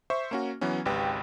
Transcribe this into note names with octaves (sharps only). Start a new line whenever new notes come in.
C5 E5 C#6
A#3 C#4 F#4
E3 F#3 B3 C#4
G#1 C#2 G4 B4 G5